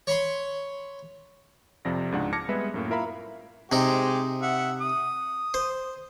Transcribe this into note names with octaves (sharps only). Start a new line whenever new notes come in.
C#5 B5 C6
F2 C3 F3 D5 A#6
C#2 G#2 D4 F#5
A5 D6 F6 G#6 A#6 C#7
G3 G#3 B3 B4 E5
F#2 A2 A#3
E4 F4 A#4 E5 F5 B5
C3 G#3 D#4 G4 C5
E5 F#5
D#6
C5